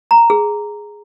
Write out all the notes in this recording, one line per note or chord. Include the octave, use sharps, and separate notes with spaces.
A#5
G#4